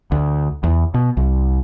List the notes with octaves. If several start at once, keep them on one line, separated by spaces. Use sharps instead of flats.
D2
E2
B2
C2